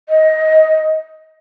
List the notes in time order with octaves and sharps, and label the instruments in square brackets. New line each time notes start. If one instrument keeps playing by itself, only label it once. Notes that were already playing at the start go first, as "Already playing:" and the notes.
[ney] D#5